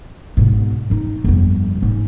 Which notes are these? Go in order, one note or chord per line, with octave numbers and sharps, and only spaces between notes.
G#2 B2
C#4 D#4
G1 F2
G#2 C#4